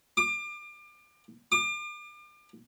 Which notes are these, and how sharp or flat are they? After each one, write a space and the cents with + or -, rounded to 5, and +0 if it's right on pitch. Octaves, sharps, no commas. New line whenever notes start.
D6 +35
D6 +40